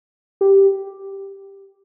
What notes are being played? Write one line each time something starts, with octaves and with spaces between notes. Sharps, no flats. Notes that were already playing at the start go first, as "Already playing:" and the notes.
G4